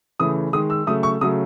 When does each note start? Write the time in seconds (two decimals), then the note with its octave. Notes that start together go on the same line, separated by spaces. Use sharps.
0.20 C#3 E3 A3 D#6
0.53 D#3 G#3 D#6
0.70 E6
0.87 C#3 F#3 A3 D#6
1.03 C#6
1.21 C#3 F#3 A3 D#6